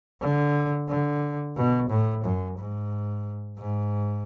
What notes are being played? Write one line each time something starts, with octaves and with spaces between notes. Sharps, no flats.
D3
D3
B2
A2
F#2
G#2
G#2